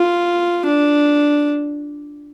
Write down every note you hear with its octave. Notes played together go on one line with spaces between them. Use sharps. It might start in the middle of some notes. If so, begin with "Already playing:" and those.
Already playing: F4
D4